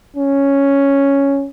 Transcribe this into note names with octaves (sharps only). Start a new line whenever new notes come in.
C#4